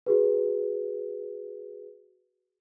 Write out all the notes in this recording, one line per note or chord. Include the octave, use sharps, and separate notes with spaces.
F#4 G#4 B4